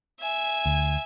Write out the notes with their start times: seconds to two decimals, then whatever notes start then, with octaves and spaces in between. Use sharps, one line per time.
0.21 E5 G#5
0.66 D2